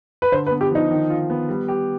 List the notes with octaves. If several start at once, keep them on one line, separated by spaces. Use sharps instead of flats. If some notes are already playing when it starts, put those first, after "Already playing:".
B4
D3 C5
B4
B3
G4
F3 D#4
D#3
F4
B3
G3
G4